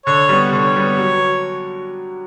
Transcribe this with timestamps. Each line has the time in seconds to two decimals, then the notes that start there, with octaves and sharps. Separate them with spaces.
0.06 D3 C#5
0.29 G3 B3
0.53 D3 C#5
0.76 G3 B3
0.99 F#3